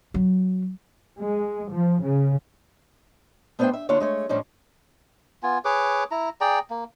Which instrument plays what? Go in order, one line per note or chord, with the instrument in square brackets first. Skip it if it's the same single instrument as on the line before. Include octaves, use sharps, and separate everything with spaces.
[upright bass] F#3
[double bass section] G#3
F3
C#3
[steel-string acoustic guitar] A3 B3 D4 C5 E5 G5
E5
D3 A#3 D4 E4 F4 C#5
G#3 A3 C#5
A2 F3 G3 G#3 C#4 D4
[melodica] B3 F4 G#5
G#4 B4 C#5 D6
E4 A#5
G#4 D5 G5 A#5
A#3